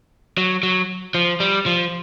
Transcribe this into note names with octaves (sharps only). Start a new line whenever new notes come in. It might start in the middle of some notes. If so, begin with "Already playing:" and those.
F#3
F#3
F3
G3
F3